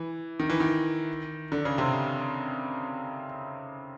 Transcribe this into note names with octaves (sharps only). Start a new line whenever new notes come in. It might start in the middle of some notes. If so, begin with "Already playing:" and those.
Already playing: E3
D#3
E3
D#3
D3
C#3
C3